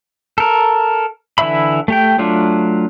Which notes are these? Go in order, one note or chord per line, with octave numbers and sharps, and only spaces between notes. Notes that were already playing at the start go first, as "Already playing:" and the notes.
A4 A#4
D3 E3 E4 E5 B5
A3 G4 G5
F#3 A3 D4 F4